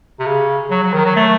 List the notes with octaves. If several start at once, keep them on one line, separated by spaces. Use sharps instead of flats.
C3
C#3
F#3
F#3
D#3
F#3
A3